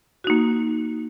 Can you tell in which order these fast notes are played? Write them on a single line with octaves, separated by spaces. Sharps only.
F#4 D#4 A#3